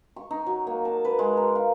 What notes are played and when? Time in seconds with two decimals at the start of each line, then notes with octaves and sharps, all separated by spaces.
0.16 C#6
0.31 D#4
0.46 F#3
0.67 A#3
0.85 A5
1.05 B4
1.19 G#3
1.37 A#4
1.55 F5